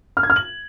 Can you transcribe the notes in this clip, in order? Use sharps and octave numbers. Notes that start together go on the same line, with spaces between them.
F6
G#6
F6
F#7